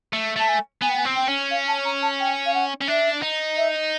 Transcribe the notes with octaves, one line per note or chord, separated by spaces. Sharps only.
A3
A3 A5
G#5
B3 G#5
G5
G#5
C4
G5
C#4
F5
A5
A#5
A5
G5
F5
F#5
C#4
D4 E5
D#4
E5